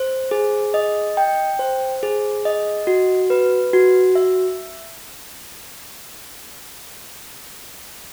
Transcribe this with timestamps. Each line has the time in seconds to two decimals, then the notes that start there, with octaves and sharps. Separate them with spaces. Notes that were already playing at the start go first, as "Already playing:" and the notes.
Already playing: C5
0.31 G#4
0.74 D#5
1.17 G5
1.59 C5
2.03 G#4
2.45 D#5
2.87 F#4
3.30 B4
3.73 F#4
4.15 E5